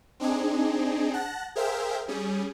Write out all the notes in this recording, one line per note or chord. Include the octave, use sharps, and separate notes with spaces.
C4 D4 D#4 G#4
F#5 A5 F#6 A#6
G#4 A#4 C5 E5 F5 G5
G3 C#4 G#4